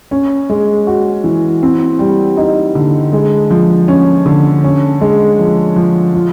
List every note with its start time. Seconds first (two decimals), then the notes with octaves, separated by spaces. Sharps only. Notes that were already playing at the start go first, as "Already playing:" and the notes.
0.11 C#4
0.50 G#3
0.87 F#4
1.24 E3
1.63 C4
1.99 G3
2.37 D#4
2.75 D3
3.13 G#3
3.51 F3
3.88 C#4
4.26 D3
4.64 C#4
5.01 G#3
5.39 F3
5.76 F3
6.15 F4